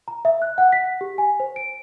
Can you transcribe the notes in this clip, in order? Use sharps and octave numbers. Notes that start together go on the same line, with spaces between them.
A#5
E5
F#6
F#5
B6
G4
G#5
C5
D7